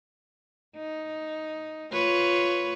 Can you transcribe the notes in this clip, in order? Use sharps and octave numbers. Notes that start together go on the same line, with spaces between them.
D#4
F4 B4 C#5